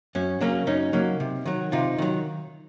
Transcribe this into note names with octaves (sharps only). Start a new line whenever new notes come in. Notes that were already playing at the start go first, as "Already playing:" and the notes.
F#2 C#4
C#3 F#3 A#3 C#4 D4
F#2 C#4 D#4
C#3 F#3 A#3 C#4
C3
D#3 F#3
C3 D#4 F4
D#3 F#3